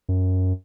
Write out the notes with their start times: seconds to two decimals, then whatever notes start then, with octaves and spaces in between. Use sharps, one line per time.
0.09 F#2